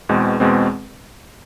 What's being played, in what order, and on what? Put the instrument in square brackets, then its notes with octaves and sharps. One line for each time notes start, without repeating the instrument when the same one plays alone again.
[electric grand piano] E2 B2 G#3 C4
E2 B2 G#3 C4